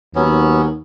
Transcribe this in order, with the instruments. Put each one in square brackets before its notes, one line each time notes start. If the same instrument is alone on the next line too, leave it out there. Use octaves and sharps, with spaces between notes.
[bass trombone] D#2 [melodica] F#3 B3 C#4